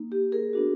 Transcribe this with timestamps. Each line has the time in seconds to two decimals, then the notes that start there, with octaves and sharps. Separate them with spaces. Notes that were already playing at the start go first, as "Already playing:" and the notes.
Already playing: A#3 D#4
0.12 G4
0.32 G#4 A#4
0.53 B3 D4 F#4